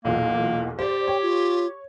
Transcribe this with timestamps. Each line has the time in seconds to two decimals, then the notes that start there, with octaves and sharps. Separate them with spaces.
0.05 B1 E2 A#2 A#3
0.79 G4 C5 D5
1.08 C#5 G5
1.23 F4